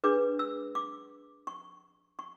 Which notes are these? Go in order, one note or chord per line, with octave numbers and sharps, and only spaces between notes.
D4 G#4 B4 D6
E6
D6
C#6
C#6